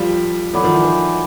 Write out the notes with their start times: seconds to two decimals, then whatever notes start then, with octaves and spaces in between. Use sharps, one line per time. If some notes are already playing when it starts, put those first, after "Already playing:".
Already playing: F3 G3 F4 A4 C5 F5
0.53 E3 F#3 A4 D5 F#5 B5 D6
0.64 D#3 F3
0.74 E3
0.85 D#3